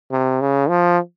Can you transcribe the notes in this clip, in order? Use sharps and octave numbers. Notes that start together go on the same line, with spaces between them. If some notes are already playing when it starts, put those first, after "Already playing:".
C3
C#3
F3